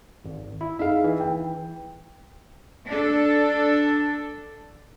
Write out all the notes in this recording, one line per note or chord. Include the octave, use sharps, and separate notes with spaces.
G#1
E4
D#4 G#4 E5 F5
E3
G5
D4 A4